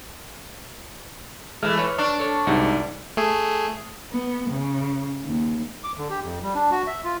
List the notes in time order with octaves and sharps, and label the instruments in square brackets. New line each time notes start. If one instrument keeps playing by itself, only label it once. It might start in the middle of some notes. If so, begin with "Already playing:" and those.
[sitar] E3 A3 [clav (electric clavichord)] G#3 [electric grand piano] F6
[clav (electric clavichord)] B4 C#5
[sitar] D4 [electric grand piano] C#6
[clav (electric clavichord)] A4 C#5
[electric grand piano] C2 G#2 C3 [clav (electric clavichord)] D#4 F#4
[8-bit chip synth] A3 G#4
[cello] B3
C#3
D#2
[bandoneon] D6
D3
G4
F2
G3
D4
F#4
E5
F4